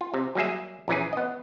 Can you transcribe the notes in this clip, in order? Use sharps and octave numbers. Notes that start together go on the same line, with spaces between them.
F4
C3
F#3 G3 A#3 G#4 E5
A#1 A#2 E3 C#4 G#4
B3 D#5